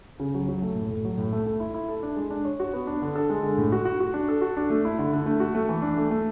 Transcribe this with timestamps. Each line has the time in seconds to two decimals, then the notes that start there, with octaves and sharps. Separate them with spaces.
0.20 C#3
0.34 F#3
0.48 F#3
0.62 A3
0.75 A2
0.91 A2
1.05 F#3
1.18 A2
1.33 A3
1.46 A3
1.60 E4
1.74 E4
1.88 A4
2.03 D4
2.16 G#3
2.30 D4
2.45 C#5
2.60 F#4
2.73 B3
2.87 D4
3.02 D3
3.16 A4
3.30 G#3
3.43 D3
3.58 A2
3.72 F#4
3.85 F#4
4.00 F#4
4.14 D4
4.29 A4
4.41 F#4
4.57 D4
4.70 A3
4.85 E4
4.99 D3
5.13 D3
5.26 A3
5.40 F#4
5.55 A3
5.69 E3
5.82 D4
5.97 A3
6.11 A3